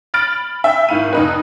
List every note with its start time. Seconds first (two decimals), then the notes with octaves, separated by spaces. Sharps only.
0.14 B5 F6 A6 D7
0.64 E5 G5 E6
0.89 G#1 E4 F5 B5 D#7
1.13 F1 D#4 B4